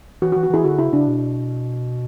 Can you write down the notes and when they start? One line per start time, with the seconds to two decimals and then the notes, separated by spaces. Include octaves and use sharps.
0.22 E3 F#4
0.32 F#4
0.36 E3
0.43 F#4
0.50 E3 E4 G#4
0.64 D3 F#4
0.78 C#3 E4
0.93 C#3 D4
1.08 B2